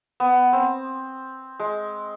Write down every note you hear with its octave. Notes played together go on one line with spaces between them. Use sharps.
B3
C4
G#3